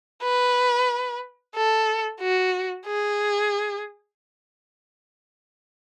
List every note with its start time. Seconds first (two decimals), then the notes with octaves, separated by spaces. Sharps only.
0.23 B4
1.55 A4
2.21 F#4
2.86 G#4